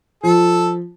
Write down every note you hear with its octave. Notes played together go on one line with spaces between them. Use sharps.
F3 A4